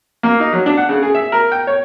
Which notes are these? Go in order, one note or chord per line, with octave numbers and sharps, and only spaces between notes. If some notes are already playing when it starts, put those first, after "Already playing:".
A#3
D#4
F#3
D4
F#5
C#3
G#4
E5
A#4
G5
C#5